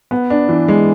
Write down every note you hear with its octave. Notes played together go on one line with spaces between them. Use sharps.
B3
D4
E3
G#3